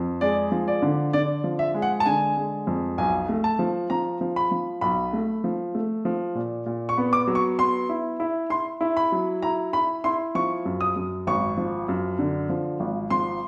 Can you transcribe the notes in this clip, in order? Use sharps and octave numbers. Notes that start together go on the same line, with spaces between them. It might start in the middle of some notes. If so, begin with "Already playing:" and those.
Already playing: F2
G#3 D5
F3
D5
D3
D3 D5
F3
E5
G#3
F#5
A5
D3 G#5
G#3
F2
B1 G#5
A3
A5
F3
F3 A#5
F3
B5
F3
B1 B5
A3
F3
A3
F3
A#2
A#2
C#6
B3
D6
F#3
C#6
B3 C6
E4
E4
E4 C6
E4
B5
F#3
E4 A#5
E4 B5
E4 C6
F3 C#6
F#2
D#6
F#2
G#1 C#6
F3
F#2
D3
F3
G#1
F3 C6